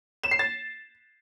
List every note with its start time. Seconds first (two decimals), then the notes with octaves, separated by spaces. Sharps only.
0.23 E7
0.31 C7
0.39 A6